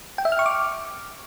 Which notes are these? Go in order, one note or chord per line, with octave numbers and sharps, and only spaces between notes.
G5
E5
F6
C#6
D6